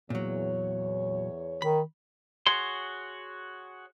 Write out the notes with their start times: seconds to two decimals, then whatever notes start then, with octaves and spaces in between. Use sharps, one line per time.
0.10 E2 A#2 F#3 C#5
1.62 D#3 B5
2.47 F#4 G#4 C#5 C6